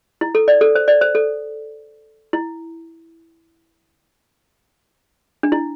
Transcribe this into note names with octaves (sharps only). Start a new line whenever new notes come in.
E4
A4
D5
A4
C5
D5
C5
A4
E4
D4
E4